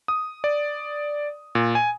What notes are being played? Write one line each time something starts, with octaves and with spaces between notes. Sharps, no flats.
D#6
D5
A#2
G#5